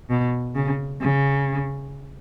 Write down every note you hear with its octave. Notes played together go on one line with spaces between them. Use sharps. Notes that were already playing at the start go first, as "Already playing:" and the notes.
B2
C#3
C#3